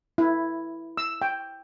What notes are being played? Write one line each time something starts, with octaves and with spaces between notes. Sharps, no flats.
E4
E6
G5